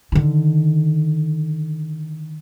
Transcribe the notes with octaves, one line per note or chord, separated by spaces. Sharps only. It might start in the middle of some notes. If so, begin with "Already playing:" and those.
D3 D#3